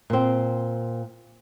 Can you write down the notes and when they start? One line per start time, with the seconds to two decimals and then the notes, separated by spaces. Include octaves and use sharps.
0.10 A#2 C4